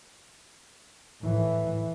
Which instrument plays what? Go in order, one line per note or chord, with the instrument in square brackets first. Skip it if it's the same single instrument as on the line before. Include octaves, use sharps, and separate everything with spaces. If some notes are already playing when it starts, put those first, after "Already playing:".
[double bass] A2 E3